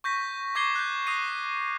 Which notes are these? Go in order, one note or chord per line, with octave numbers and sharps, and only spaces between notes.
C#6 G6 A#6 B6
C#6 D6 G#6 C7 G7
F#6 G6
D#6 A#6 C7 D#7